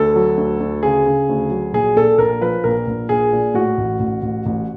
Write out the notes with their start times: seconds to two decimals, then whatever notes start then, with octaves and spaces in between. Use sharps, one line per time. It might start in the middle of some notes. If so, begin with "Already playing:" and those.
Already playing: D2 A4
0.16 F#3
0.37 D2
0.60 D2
0.83 C#3 G#4
1.06 C#3
1.29 D2
1.51 F#3
1.73 A#1 G#4
1.96 A#2 A4
2.18 A#1 A#4
2.41 F3 B4
2.64 A#1 A#4
2.87 A#1
3.09 A#1 G#4
3.33 A#2
3.54 A2 F#4
3.78 A1
4.00 A1
4.23 A1
4.46 A1